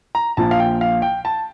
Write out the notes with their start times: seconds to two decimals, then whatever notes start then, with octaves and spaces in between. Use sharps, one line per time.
0.15 A#5
0.37 A#1 A#2 A5
0.51 F5
0.59 G5
0.81 F5
1.02 G5
1.25 A5